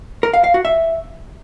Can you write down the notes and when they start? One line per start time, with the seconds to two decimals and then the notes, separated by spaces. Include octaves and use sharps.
0.23 A#4
0.33 F5
0.44 F5
0.54 F#4
0.65 E5